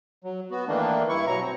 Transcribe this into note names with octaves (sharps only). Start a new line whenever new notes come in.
F#3
B3 F#4
D#3 E3 A3 A#3 D4
G2 E4 C#6
B2 F#3 A#5 C#6
C4